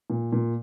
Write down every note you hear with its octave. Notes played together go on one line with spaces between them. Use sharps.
A#2
A#2